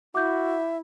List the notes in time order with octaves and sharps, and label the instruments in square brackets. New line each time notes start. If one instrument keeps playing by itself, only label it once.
[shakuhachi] E4 [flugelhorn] F#4 [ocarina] E5 [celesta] D6 G6